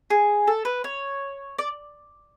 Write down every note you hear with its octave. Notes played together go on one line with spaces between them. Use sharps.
G#4
A4
B4
C#5
D5